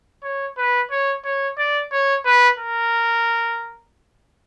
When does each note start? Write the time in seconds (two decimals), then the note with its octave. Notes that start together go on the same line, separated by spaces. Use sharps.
0.24 C#5
0.58 B4
0.91 C#5
1.25 C#5
1.58 D5
1.92 C#5
2.25 B4
2.59 A#4